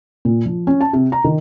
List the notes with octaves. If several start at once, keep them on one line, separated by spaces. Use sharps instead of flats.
A#2
F3
C#4
A5
C3
A#5
D#3